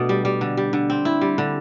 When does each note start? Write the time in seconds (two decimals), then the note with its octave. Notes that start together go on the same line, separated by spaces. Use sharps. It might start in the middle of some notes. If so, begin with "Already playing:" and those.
Already playing: B2 A3 D4
0.09 G3
0.25 G3
0.41 D3
0.57 G3
0.73 D3
0.90 C4
1.05 E4
1.21 G3
1.38 D3